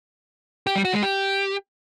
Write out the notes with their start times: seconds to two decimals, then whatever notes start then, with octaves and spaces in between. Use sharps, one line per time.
0.67 G4
0.76 G3
0.85 F#4
0.94 G#3
1.03 G4